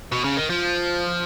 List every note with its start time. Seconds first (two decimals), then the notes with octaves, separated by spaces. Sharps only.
0.12 B2
0.24 C#3
0.37 D#3
0.50 F3